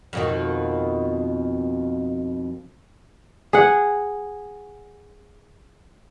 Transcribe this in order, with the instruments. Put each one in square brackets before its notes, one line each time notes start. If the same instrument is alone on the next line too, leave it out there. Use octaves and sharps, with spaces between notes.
[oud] F2 B2 D#3
[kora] G#4 F#5